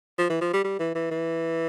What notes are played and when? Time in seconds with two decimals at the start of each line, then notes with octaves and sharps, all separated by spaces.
0.18 F3
0.30 E3
0.41 F3
0.53 G3
0.64 G3
0.80 E3
0.95 E3
1.11 E3